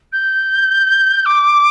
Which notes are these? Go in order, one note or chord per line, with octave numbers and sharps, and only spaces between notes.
G6
D6